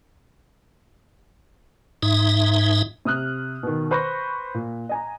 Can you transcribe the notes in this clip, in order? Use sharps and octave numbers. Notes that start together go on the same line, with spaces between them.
G#2 D#4 E5
C3 D#6 F6 F#6
B2 D#3
B4 C5 B5 C#6 F#6 A#6
A#2
D#5 G#5 A#5